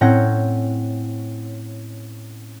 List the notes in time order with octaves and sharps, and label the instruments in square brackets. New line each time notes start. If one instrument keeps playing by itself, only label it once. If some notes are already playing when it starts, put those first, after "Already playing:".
[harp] A2 C4 C#4 F#5 G6 A#6